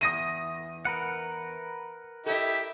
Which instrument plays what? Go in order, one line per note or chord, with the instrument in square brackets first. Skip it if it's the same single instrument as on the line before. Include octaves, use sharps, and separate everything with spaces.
[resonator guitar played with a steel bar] E2 [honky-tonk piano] D#6 A#6 D#7
[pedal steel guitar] A#4 B4 F#5
[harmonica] E4 G4 E5 [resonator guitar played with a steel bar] A4 D#5